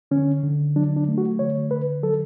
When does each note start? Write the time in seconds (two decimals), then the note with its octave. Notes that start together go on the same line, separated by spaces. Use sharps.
0.11 D3 C#4
0.43 D3
0.76 F#3 D4
0.97 D4
1.08 A3
1.18 F#4
1.39 D3 C#5
1.71 D3 B4
2.03 F#3 A4